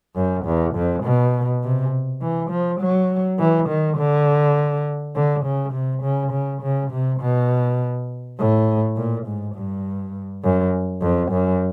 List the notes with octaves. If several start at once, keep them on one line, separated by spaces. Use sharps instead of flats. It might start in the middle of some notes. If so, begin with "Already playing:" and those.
F#2
E2
F2
B2
C3
E3
F3
F#3
E3
D#3
D3
D3
C#3
C3
C#3
C#3
C#3
C3
B2
A2
A#2
G#2
G2
F#2
F2
F#2